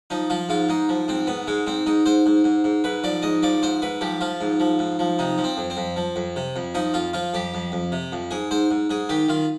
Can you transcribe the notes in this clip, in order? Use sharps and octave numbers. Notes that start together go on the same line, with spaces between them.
F3 D#4
F3 F4
G#2 F4
G#2 D#4
F3
G#2 C4
G#2 B3
G#2 G#3
G#2 C4
G#2 D#4
G#2 C5
G#2
G#2
G#2
G#2 B4
F3 D5
G#2 D#5
F3 D5
G#2 C5
G#2 B4
F3 G4
F3 F4
G#2
F3
G#2
F3
C3 D#4
F3
C4
F2
C4
F2
F3
F2
C3
F2
F3 D#4
F2 F4
F3 F4
F2 G4
F2
F2
C3
F2
G#2 G#4
G#2 C5
G#2
G#2 G#4
D#3 G4
D#3 F4